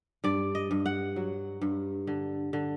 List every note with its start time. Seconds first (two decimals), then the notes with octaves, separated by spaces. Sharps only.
0.24 G2 D5
0.55 D#5
0.71 G2
0.86 F#5
1.16 F#3
1.62 G2
2.07 D3
2.53 D3